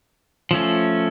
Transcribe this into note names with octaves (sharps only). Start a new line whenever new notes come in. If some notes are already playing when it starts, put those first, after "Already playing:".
F3 A3 C#4